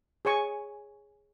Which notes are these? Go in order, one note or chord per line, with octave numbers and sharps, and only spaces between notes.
G#4 C#5 G#5 C#6